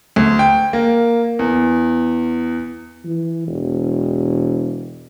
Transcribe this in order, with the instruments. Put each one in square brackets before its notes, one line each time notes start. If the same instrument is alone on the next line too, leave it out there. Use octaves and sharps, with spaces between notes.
[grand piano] D2
G5
A#3
E2
[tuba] E3
E1